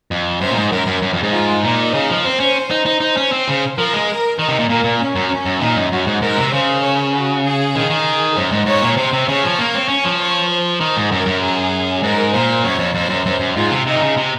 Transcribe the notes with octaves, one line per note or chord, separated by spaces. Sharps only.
F2
F#2 C5
A#2
G#2
F#2 A#4
F#2
F#2
F2
G#2
F4
A#2 D#4
C#3
F3
C4 C5
C#4
D#4
D#4 C5
D#4
C#4
C4
C#3
F3 A#4
G#3
A#4
D#3 D#4
C3
A#2
A#2 A#3
A#2
C#4
F#2
C#4
F#2
A#2 D#4
F#2
F#2 F#4
G#2
G#2 A#4
C3
C#3 C5
C#5
F#4
G#4
D#3
D#3
F#2 C5
G#2
G#2 C#5
A#2
C3 C5
C3
C#3 C#5
F3
A#3
C4
C#4
F3
C#5
C5
D#3
G#2
F#2 A#4
F#2
G#4
G#2 A#4
A#2 C5
F#2 C#5
F2
F2 C5
F#2
F#2 C5
F#2
G#2 F4
C3
C3 D#4
D#3
C#3
C3